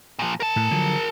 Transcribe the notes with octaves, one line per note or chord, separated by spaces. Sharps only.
A#2 F3
A#4 A5
A2
D3 F3 F#3